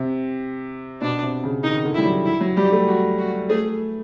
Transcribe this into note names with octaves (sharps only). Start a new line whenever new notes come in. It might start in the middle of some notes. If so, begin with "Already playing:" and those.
Already playing: C3
B2 D4
C3
C#3
D#3 D#4
D3
G3 E4
F#3
E4
F#3
G3 G4
A3
F#4
F#4
A3 G#4